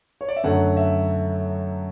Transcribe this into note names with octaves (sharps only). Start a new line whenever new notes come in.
C#5
D5
E5
F#2 D3 F#3 A3 F#5
E5